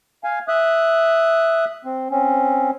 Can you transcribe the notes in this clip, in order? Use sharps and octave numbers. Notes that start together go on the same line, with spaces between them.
F5 G#5
E5 D#6 F#6
C4
C4 C#4